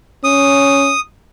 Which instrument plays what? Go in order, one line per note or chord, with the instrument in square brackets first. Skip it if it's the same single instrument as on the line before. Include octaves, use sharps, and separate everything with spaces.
[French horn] C#4 [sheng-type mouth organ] D#6